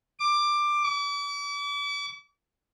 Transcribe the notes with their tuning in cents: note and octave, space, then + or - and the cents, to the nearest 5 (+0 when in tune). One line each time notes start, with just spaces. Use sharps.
D6 +15
D6 -40